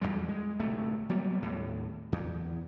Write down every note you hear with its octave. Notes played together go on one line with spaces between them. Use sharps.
E2 G#2 G3 G#3
G#3
D1 B1 C3 A3
F#3 G3 A#3 B3
D#2 A2
E2